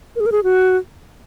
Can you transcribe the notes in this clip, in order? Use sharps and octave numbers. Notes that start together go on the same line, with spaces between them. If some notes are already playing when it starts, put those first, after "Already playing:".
A#4
G#4
A#4
G#4
F#4